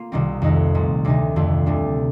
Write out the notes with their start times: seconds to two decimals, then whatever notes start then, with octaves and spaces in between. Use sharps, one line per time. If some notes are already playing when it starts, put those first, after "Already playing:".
Already playing: A#3 F4
0.12 C2 C3 D#3 G3 C4
0.42 F2 D#3 A3 D#4
0.75 C2 A#2 G3
1.05 D2 C3 D#3 A3 D#4
1.36 F2 D3 F3 A3 C4
1.66 D2 C3 G3 D4